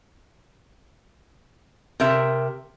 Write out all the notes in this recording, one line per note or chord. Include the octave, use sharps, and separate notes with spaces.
C3 A#4 E5